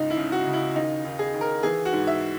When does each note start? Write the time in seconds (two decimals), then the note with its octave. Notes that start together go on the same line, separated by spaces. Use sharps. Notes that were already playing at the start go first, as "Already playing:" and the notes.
Already playing: C#2 G#2 D#4
0.10 E4
0.17 C#3
0.32 F#4
0.47 C#3
0.53 E4
0.75 D#2 D#4
1.05 D#2
1.19 G#4
1.34 D#2
1.41 A#4
1.63 E3 G#4
1.85 F#4
1.93 G#2
2.07 E5